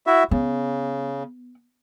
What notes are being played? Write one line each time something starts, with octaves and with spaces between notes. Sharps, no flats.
E4 F#4 E5
C#3 B3